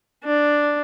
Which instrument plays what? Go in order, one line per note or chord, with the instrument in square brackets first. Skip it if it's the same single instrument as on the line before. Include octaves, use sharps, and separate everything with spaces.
[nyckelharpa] D4